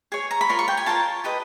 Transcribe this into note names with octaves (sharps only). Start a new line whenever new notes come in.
G#4 C#5 G#5
A#5
B5
F4 A#4 C#5 C6
C#6
G5
G#5
F4 A#4 C#5 A5
G4 B4 D#5